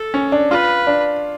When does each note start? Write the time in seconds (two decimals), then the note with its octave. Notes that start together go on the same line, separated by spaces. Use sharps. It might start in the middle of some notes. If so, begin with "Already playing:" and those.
Already playing: A4
0.14 C#4
0.32 D4
0.51 F4 B4
0.87 D4